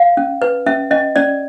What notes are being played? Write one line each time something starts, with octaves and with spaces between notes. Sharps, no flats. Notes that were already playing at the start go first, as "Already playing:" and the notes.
Already playing: F5
C#4
B4
C#4 E5
C#4 D#5
C#4 D5